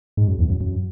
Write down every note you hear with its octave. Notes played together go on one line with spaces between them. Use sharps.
G#2
F#2
E2
F#2
F#2